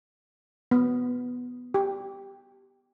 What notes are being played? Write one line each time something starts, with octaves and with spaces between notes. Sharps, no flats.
B3
G4